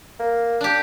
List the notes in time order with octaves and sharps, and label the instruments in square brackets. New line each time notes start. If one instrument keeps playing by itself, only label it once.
[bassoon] A#3
[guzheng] D4 G4